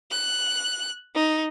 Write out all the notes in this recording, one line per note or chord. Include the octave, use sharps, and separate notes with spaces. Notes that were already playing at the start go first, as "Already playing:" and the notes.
F#6
D#4